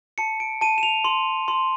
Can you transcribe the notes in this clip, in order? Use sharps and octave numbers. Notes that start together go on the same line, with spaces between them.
A5 C#7
D7
A5 D#7
E7
F7
C6
C6